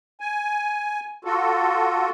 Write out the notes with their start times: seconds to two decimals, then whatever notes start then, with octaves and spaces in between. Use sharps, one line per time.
0.21 G#5
1.25 F4 F#4 A4